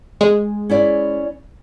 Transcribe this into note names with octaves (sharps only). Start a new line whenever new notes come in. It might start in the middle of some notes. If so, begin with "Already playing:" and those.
G#3
C#4 E4 D5